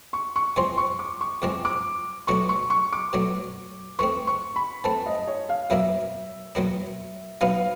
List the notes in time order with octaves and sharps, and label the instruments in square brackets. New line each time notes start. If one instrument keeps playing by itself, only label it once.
[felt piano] C#6
C#6
[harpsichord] E2 C3 F3 G#3 C4 [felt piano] C6
[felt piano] C#6
D6
C#6
[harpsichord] E2 C3 F3 G#3 C4 [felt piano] D6
[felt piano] D6
[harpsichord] B2 F#3 A3 D4 [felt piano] C#6
[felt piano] C#6
C#6
D6
[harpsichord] B2 F#3 A3 D4
[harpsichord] E3 A3 C4 [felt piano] C#6
[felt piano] C#6
B5
[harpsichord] E3 A3 C4 [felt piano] A5
[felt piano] D#5
C#5
F5
[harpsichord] E2 B2 F#3 A#3 D4 [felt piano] E5
[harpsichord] E2 B2 F#3 A#3 D4
[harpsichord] B2 F#3 B3 D#4 [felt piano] F5